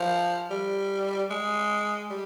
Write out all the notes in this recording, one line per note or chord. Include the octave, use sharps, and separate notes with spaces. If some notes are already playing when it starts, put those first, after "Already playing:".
Already playing: F3
G3
G#3
G3